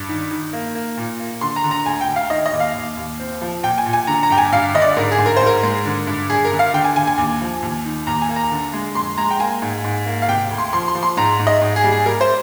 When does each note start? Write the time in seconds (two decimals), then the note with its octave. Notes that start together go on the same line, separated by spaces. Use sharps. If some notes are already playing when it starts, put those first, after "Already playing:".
Already playing: G2
0.09 D#3
0.31 D#3
0.53 A#3
0.75 A#3
0.97 A#2
1.20 A#3
1.41 D3 C6
1.56 A#5
1.64 D3
1.71 A#5
1.86 D2 G#5
2.01 G5
2.08 D2
2.16 F5
2.30 D#3 D#5
2.46 D#5
2.53 D#2
2.60 F5
2.75 D#2
2.97 D#2
3.20 C4
3.41 F3
3.63 A#2 G5
3.78 G#5
3.86 A#2
3.93 G#5
4.07 D3 A#5
4.23 A#5
4.30 G2 G5
4.38 G#5
4.52 G2 F5
4.74 D3 D#5
4.82 D5
4.97 G#2 A#4
5.11 G#4
5.18 G#2
5.26 A#4
5.37 G#2 C5
5.46 A#4
5.63 G#3
5.85 D3
6.07 G2
6.30 G2 G#4
6.45 A#4
6.52 D3
6.59 F5
6.74 D3 G5
6.84 G#5
6.96 D3 G#5
7.07 G#5
7.18 D#2
7.41 F3
7.63 D#2
7.85 D#3
8.07 D#2 A#5
8.22 G#5
8.29 A#3
8.36 A#5
8.51 D3
8.74 G#3
8.95 F2 C6
9.17 G#3 A#5
9.31 G5
9.40 A#3 G#5
9.62 G#2
9.84 G#2
10.06 A#3
10.22 F5
10.28 C3 G5
10.51 D2
10.58 C6
10.73 F3 C6
10.88 C6
10.95 F3
11.03 C6
11.17 G#2 A#5
11.39 G#2
11.47 D#5
11.61 G#2
11.76 G#4
11.84 G3
11.91 G#4
12.06 G3 A#4
12.21 C5